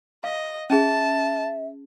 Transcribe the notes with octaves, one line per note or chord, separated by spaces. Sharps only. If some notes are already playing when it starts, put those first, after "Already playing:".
D#5 F5
C#4 G#4 E5 A5